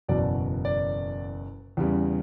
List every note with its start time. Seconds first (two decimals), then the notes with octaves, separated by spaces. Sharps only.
0.08 F#1 E2 B2 F#3 D5
0.65 D5
1.77 E2 C#3 G3